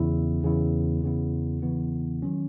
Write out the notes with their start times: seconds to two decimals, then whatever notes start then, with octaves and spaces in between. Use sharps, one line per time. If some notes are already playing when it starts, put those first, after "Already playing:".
Already playing: E2 C#3 E3 B3 E4
0.43 E2 C#3 E3 B3 E4
1.03 E2 C#3 E3 B3 E4
1.62 E2 C#3 E3 B3 E4
2.22 D#3 F#3 C#4